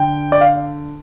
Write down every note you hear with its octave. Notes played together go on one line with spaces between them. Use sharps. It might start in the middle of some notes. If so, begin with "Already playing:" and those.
Already playing: D3 G5
D5
F5